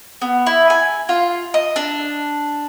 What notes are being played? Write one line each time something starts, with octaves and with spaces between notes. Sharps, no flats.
B3
E4
G#5
F4
D#5
D4